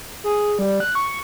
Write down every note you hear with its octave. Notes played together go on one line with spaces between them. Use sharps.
G#4
G3
F#6
C#6